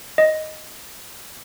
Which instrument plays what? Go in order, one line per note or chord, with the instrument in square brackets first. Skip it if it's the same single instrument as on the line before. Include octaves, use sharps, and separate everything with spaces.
[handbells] D#5